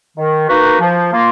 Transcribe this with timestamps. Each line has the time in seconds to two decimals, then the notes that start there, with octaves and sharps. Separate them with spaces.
0.17 D#3
0.49 A#3 D#4 F#4 B4
0.80 F3
1.12 A#3 F4